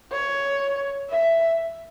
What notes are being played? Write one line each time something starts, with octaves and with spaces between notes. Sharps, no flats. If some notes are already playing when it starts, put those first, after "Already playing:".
C#5
E5